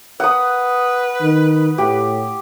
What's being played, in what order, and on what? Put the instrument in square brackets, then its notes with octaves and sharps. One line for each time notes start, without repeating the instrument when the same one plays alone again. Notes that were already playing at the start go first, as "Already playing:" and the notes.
[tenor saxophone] B4 [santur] F#5 D#6
[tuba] D#3
[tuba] A2 [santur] G4